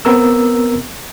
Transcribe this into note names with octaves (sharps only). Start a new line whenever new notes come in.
B3 C4 A#4 A#5 E6